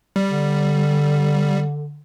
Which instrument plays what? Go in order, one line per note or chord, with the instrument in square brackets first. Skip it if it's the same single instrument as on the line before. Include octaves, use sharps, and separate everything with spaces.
[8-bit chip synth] G3
[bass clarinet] D3